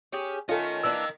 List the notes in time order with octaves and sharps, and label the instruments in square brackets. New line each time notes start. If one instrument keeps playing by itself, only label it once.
[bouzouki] C#4 G4 G#4
[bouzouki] A3 C#4 [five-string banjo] F4 A4 [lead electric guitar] A#4 D#5
[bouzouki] E3 A#3 D4 [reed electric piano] E6